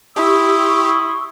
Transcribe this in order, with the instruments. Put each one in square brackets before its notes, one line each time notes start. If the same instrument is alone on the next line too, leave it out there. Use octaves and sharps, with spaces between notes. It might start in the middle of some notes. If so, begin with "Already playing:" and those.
[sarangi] E4 [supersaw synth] G4 [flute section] C6 C#6 E6 [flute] D#6